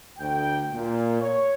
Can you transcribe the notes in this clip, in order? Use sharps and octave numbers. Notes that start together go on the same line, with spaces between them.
D2 G5
A#2
C#5